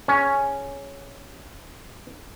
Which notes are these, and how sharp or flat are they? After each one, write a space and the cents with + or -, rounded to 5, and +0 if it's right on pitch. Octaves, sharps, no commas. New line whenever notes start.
C#4 +0 G#4 +0